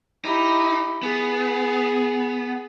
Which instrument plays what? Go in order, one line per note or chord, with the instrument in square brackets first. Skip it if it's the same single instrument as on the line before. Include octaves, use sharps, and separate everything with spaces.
[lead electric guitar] D#4 [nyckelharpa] E4 G4
[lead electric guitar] B3 [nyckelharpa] G#4